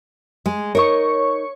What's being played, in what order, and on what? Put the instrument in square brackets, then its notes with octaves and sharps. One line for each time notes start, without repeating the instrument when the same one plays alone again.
[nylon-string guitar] G#3
[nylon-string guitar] D#4 A#4 [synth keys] C#5 C#6